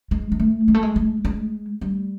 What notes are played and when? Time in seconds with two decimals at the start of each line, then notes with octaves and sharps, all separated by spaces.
0.11 G#3
0.32 G#3
0.40 A3
0.68 G#3
0.75 A3
0.83 G#3
0.96 G#3
1.25 G#3
1.81 G3